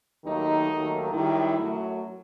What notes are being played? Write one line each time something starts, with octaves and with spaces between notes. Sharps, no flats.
D#2 D#3 F#3 A3 D#4
D#2 D#3 F#3 A3
F#2 D#3 G3 E4
F#2 F#3 A3